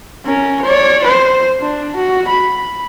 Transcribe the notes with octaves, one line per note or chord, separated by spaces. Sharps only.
C#4 A#4
C#5 D5
C5
D4
F#4
B5